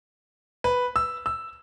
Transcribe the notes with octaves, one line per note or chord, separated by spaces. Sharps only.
B4
E6
E6